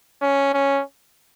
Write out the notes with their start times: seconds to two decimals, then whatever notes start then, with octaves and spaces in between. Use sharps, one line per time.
0.21 C#4
0.54 C#4